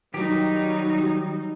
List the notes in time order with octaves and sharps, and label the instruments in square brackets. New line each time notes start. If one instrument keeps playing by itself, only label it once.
[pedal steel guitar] D#3 G4 [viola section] F#3 G3 D#4